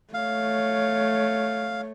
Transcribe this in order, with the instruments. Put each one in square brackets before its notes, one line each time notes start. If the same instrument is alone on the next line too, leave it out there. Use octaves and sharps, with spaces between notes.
[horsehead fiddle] A3 C#5 [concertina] F5